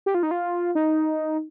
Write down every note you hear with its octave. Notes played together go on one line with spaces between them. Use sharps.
G4
F4
D#4
F4
D#4